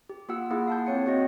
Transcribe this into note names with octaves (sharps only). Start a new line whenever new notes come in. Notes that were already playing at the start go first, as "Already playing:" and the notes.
G4
A#3 F4 G4 F#5 E6
A#3 E4 G#4 F#5
F5 A5 G6
C4 C#5 C#7
C4 F#4 C#5 D#5